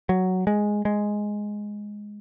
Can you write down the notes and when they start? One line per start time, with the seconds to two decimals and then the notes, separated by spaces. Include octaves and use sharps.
0.09 F#3
0.47 G#3
0.85 G#3